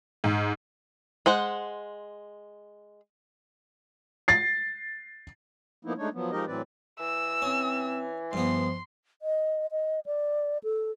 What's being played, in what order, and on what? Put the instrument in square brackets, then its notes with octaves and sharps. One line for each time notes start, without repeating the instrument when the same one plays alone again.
[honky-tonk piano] G#2
[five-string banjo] G#3 C5 F#5
[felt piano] A6 C7
[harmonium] F3 A#3 B3 D#4 E4
G#3 A3 D4 D#4 C#5
F3 F#3 B3
F3 G#3 D#4 G4 A#4 D#5
A2 E3 F#3 C4 B4 D5
[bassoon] E3 [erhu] E6
[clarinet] C4 [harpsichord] C#4
[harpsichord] G2 B3 [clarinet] F3 [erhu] C6
[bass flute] D#5
D#5
D5
A4